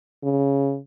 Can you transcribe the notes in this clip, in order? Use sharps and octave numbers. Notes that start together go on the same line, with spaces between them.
C#3